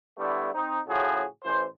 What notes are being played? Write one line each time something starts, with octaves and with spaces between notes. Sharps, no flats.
D3 G3 A3 B3 E4
C4 D#4
A2 C#3 F3 F#4 G#4
A1 E3 C5